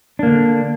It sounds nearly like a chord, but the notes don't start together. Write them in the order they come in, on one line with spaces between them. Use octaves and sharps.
D4 A#3 D3